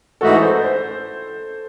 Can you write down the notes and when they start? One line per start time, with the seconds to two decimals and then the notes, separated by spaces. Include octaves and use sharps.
0.20 G#2 E3 A3 D#4 F#4 A4
0.31 A4
0.42 C5
0.53 A4
0.64 C5